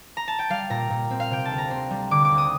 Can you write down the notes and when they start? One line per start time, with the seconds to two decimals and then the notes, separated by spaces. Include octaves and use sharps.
0.17 A#5
0.28 A5
0.39 G5
0.50 G3 F5
0.70 A#2 A#5
0.90 A#2
1.11 C4
1.20 F5
1.31 C3 G5
1.45 A5
1.51 D2
1.58 A#5
1.71 C4 C6
1.91 G3
2.11 D3 D6
2.25 D6
2.31 D2
2.38 D#6